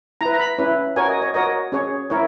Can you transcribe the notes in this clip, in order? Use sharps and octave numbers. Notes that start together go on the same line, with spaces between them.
E4 B4 A#5
A#5
B5
C#4 E4 B4
F#4 A#4 C#5 G#5
D#5
C#5
F#4 A#4 C#5 D#5
C#4 G#4 C#5
E4 A#4 C#5